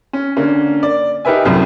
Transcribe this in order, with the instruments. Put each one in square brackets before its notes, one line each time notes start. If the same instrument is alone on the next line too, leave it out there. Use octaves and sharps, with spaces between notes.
[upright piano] C#4
D3 A#3 C#4
D5
D#4 G4 A#4 B4 E5 G#5
C2 F#2 A2